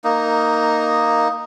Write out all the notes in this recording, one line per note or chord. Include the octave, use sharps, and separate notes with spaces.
A#3 D#4